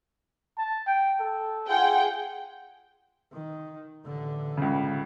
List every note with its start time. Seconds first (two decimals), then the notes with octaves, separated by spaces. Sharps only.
0.58 A5
0.87 G5
1.20 A4
1.69 F4 G#4 F#5 G5
3.33 D#3
4.05 A1 D3
4.57 C#2 C#3